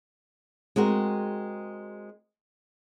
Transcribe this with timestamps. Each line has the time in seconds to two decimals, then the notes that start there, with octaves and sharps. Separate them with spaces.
0.76 G#3 C4 F#4 A#4